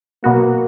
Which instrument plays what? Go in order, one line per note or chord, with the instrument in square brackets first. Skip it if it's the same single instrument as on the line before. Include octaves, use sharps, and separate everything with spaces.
[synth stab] B2 F#3 B3 F#4 [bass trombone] A#3